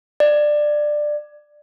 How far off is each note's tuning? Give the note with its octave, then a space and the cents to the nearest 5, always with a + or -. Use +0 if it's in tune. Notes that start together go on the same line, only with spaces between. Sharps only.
D5 +15